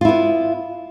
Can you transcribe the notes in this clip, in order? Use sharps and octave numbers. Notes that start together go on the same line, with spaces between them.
B3 E4 F4